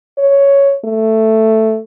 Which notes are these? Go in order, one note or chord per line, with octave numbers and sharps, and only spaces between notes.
C#5
A3